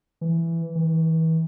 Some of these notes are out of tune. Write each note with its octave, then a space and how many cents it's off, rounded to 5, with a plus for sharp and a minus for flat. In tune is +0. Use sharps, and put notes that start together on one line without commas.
E3 +10
E3 -35